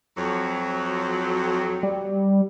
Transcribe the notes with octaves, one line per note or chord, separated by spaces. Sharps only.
F2 F#3
G3